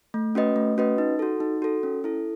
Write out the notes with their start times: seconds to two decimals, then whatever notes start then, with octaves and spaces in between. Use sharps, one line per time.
0.14 A3
0.35 C#4 F#4 B4 D#5
0.56 A3
0.78 C#4 F#4 B4 D#5
0.98 D#4
1.19 F#4 A4
1.40 D#4
1.62 F#4 A4
1.83 C#4
2.04 E4 A4